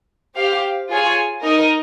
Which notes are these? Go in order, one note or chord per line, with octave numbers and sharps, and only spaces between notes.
G4 C5 F5
F4 G#4 C#5 G#5
D#4 A#4 D#5